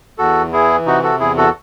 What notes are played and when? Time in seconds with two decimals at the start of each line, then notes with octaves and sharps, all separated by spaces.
0.18 E2 F#4 A4
0.52 E3 E4 G#4
0.86 C3 D#4 F#4
1.03 F#4 A4
1.20 E2 E4 G#4
1.37 F#4 A4